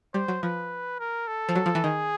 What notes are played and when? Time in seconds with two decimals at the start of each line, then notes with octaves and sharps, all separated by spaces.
0.14 G3 C5
0.28 F#3
0.43 F3 B4
0.99 A#4
1.28 A4
1.49 F3
1.55 F#3
1.66 F3
1.75 E3
1.84 D#3 G#4